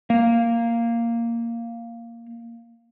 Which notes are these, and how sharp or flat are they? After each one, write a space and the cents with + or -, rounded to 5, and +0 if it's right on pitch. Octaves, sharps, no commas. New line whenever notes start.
A#3 -5